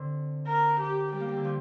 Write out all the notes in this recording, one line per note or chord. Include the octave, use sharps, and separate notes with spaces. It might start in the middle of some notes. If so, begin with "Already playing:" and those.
Already playing: D3 C4
A#4
G4
G3 G4
A#3
G3
D3
F3